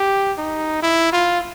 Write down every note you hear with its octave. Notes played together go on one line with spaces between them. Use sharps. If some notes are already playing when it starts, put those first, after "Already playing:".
Already playing: G4
D#4
E4
F4